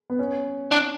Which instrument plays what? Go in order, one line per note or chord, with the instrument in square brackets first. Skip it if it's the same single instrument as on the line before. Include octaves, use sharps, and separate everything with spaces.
[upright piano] B3
C#4
[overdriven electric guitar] D4